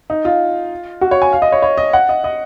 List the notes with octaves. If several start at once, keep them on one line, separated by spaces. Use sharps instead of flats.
D#4
F4
F#4
C#5
G#5
F5
D#5
C#5
C#5
D#5
F#5
D#5
D#5